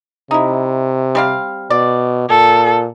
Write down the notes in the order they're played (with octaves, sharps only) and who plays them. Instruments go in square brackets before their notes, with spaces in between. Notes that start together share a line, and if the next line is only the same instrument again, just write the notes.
[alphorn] C3 [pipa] D#4 E4
[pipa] G3 C4 F5
[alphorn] B2 [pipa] D5
[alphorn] A#2 [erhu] A4